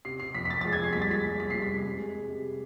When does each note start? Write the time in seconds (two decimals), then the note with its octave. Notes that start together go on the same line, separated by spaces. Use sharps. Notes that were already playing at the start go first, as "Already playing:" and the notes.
0.05 C3 C7
0.20 C3 C7
0.35 F2 B6
0.45 B6
0.50 F2 A6
0.61 A6
0.65 G#3
0.73 G#6
0.80 F2 C7
0.93 C2 B6
1.02 A6
1.10 G#3 B6
1.25 C2
1.40 C3 B6
1.50 C7
1.55 C2
1.62 B6
1.70 C3
1.85 C3
1.99 G#3
2.14 G#3
2.29 C3